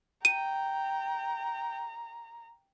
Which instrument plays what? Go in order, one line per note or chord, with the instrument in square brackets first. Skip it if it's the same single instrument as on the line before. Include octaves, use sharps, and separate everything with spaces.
[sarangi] G5 [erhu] A#5 [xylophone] D#7